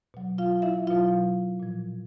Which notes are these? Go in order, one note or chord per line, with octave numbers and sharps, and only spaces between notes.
B2 F#3
F4 F5
E4 E5
B2 F#3 F4 F5
A#2 F3